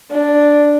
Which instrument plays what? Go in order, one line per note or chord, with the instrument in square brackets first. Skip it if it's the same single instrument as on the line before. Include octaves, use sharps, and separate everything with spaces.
[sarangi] D4